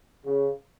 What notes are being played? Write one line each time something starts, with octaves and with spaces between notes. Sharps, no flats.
C#3